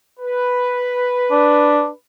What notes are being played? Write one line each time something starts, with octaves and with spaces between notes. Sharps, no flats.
B4
D4